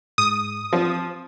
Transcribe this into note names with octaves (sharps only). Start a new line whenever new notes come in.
G#2 D#6
F3 C4